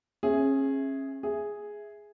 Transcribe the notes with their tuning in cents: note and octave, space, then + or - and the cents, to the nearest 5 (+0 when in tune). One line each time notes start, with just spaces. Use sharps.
C#4 -35 G#4 +0 E5 +0
G#4 +0 E5 +0